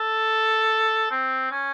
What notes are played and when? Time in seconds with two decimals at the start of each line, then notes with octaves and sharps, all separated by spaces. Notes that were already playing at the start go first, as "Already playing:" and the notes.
Already playing: A4
1.11 C4
1.51 C#4